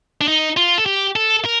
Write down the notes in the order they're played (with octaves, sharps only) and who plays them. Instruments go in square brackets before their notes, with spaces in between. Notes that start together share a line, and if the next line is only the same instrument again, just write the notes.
[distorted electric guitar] D4
D#4
F4
A4
G4
A4
A#4